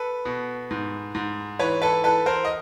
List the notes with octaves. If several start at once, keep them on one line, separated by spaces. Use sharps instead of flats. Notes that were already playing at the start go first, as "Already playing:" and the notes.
Already playing: A4 B4
B2
G#2
G#2
E3 B4 C#5
A4 B4
E3 A4 B4
A#4 C5
D#5